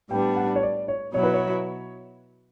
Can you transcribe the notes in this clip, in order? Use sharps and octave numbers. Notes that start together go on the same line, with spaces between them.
A2 G3 B3 D4 G5
F#5
C#5
D5
C#5
B2 F#3 B3 E4 C#5
B4
C#5